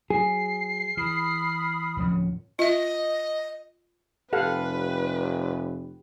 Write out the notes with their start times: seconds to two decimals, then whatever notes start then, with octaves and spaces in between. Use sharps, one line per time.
0.10 F#3 G#4 C7
0.97 E3 B5 D#6 F6
1.97 D1 F3 C#4
2.59 F4 D#5 E5
4.33 F1 G4 A4 B4 F5 F#5